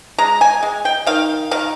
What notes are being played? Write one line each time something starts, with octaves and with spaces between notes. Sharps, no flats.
G#3 A#5
G#5
G#3
G5
D#3 F5
D#3 F5